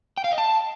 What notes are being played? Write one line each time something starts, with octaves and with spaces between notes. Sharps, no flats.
G5
F5
D#5
A5